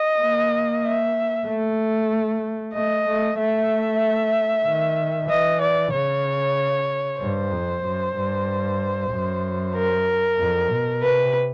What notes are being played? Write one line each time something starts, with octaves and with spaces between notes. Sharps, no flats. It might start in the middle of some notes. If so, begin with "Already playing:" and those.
Already playing: D#5
A#3
E5
A3
A3 D#5
A3
A3 E5
D#3
E3 D#5
D5
C#3 C#5
G2 C5
F2
F#2
G2
F#2
A#4
F2
B2
C3 B4